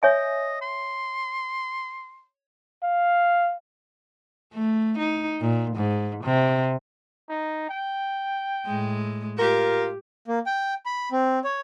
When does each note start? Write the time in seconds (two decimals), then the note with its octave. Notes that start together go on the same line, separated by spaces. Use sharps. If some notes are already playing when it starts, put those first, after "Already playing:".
0.03 C#5 D#5 E5 G#5
0.61 C6
2.83 F5
4.54 A3
4.98 D#4
5.41 A#2
5.76 G#2
6.24 C3
7.29 D#4
7.69 G5
8.66 A2 G#3
9.39 F4 G4 A#4
10.28 A#3
10.46 G5
10.86 B5
11.12 C4
11.44 C#5